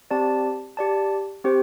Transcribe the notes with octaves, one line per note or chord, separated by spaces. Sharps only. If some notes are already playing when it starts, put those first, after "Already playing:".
C4 G4 D5 A5
G4 D5 A5
C4 G4 C5